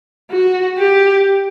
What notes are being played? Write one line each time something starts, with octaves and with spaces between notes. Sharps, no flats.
F#4
G4